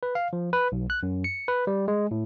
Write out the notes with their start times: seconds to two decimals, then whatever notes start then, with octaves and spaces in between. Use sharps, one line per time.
0.03 B4
0.15 F5
0.33 F3
0.53 B4
0.72 B1
0.90 F#6
1.03 F#2
1.24 C#7
1.48 B4
1.67 G3
1.88 G#3
2.11 A2